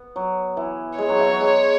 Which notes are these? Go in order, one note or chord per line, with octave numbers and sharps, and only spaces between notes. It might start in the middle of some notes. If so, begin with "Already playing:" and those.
Already playing: B3
F#3
E3
G#3 C#5
F#3
E3
F#3
G#3